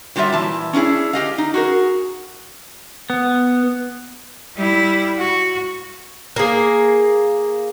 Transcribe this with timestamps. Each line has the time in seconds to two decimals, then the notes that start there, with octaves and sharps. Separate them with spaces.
0.16 F#3 G3 F4 G4 E5
0.33 A#2 E3 A5
0.73 C#4 D4 E4 G#4
1.13 G4 D#5 F5
1.38 D#4
1.54 F#4 G#4 A#4
3.10 B3
4.57 G3 E4
5.18 F#4
6.36 A#3 G#4